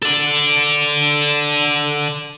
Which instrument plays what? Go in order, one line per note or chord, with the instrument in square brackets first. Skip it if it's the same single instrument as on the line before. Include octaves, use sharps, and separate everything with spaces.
[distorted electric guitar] A4 D5